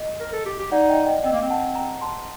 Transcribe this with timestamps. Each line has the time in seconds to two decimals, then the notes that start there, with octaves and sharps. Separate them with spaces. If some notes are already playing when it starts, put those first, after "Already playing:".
Already playing: D#5
0.20 A#4
0.33 A4
0.46 G4
0.59 G4
0.72 D#4 D5 F#5
0.89 D#5 G5
1.06 D#5 G5
1.24 C4 D#5 G5
1.32 A#3
1.42 C4
1.50 F#5 A5
1.75 G5 A#5
2.01 A5 C6